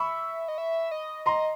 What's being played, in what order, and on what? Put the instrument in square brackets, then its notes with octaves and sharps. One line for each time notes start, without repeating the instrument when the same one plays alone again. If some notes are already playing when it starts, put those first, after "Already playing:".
Already playing: [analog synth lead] E5 [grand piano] B5 C#6
[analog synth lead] D#5
E5
D#5
[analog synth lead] D#5 [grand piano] A#5 C6